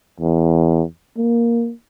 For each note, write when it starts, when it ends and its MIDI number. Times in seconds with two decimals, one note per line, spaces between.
0.20 0.83 40
1.17 1.72 58